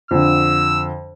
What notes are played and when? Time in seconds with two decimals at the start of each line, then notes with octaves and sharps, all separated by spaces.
0.11 F2 D3 E6